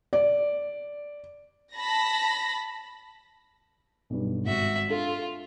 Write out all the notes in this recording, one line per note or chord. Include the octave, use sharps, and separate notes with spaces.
D5
A5 B5 A#6
B1 G2
G#1 F#4 E5
D4 F4 A4